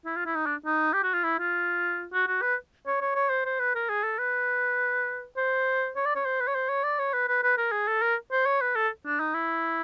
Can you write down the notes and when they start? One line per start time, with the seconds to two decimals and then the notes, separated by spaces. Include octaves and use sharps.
0.06 E4
0.16 F4
0.26 E4
0.35 D#4
0.46 D4
0.66 D#4
0.93 G4
1.03 F#4
1.13 F4
1.23 E4
1.39 F4
2.13 F#4
2.27 F#4
2.42 B4
2.86 C#5
3.01 C#5
3.15 C#5
3.30 C5
3.45 C5
3.60 B4
3.75 A#4
3.89 G#4
4.03 A4
4.18 B4
5.37 C5
5.96 C#5
6.05 D5
6.16 C#5
6.25 C5
6.40 B4
6.47 C#5
6.55 C5
6.69 C#5
6.83 D5
6.99 C#5
7.13 B4
7.28 B4
7.43 B4
7.57 A#4
7.72 G#4
7.88 A4
8.02 A#4
8.32 C5
8.46 C#5
8.61 B4
8.75 A4
9.06 D4
9.20 D#4
9.34 E4